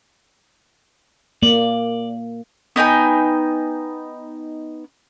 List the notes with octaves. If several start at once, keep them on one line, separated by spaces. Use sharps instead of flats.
A#3 D5
B3 D#4 G5 G#5